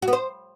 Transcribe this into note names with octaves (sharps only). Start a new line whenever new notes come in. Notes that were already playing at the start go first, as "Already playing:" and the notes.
F#4
B3
C5